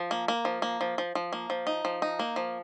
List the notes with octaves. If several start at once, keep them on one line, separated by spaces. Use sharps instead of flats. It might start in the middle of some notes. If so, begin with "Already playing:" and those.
Already playing: F3
A#3
A#3
F3
A#3
F3
F3
F3
A#3
F3
D#4
F3
D#4
A#3
F3